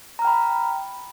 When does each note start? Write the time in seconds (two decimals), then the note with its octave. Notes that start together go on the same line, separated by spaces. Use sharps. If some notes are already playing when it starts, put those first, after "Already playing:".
0.19 A#5
0.22 F6
0.25 G5
0.27 B5